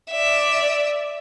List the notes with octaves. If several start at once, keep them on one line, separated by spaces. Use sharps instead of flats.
D5 E5